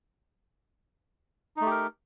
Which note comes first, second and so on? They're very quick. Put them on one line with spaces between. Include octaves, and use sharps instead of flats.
D#4 A3 G4 A#4